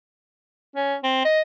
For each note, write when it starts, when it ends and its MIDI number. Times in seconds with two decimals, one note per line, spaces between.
0.76 0.95 61
1.03 1.21 60
1.25 1.41 75